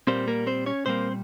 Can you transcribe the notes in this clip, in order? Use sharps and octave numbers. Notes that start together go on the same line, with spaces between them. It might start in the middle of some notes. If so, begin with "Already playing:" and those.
A#2 G3 A#3 C4 C5
A#3 A#4
C4 C5
C#4 C#5
A#2 G3 A#3 C4 C5